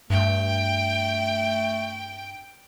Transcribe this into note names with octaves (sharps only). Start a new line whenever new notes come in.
G2 A3 G5